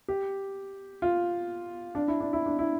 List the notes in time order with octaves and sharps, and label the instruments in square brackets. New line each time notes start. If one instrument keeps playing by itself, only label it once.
[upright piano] G4
F4
D4
E4
D4
E4
D4
E4